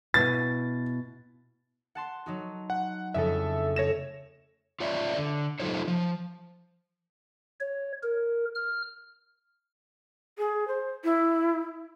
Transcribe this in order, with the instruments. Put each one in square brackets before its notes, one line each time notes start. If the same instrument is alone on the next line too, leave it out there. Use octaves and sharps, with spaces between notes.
[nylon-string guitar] B2 E4 G#5 [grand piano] A6
[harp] F#5 A5 C6
F#3 D#4 F#4
[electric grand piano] F#5
[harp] F2 C#3 E4 [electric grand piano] A4 E5
[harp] A3 A4 [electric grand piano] C#5 A#6 E7
[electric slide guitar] F4 C#5 D5 E5
D3
F#3 D#4 F4 A4 C5 C#5
F3
[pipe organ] C#5
A#4
F6
[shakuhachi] G#4
C5
E4